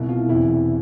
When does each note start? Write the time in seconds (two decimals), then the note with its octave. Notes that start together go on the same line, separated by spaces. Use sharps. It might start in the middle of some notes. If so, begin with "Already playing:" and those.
Already playing: C2 B2 E4
0.09 F4
0.29 E1 E2 C3 E3 E4
0.48 E4